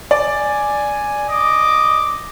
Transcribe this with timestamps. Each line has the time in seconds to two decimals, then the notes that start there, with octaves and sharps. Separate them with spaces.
0.11 D5 G#5
1.30 D#5 D6